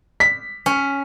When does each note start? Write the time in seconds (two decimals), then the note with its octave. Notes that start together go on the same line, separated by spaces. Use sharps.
0.20 B6
0.66 C#4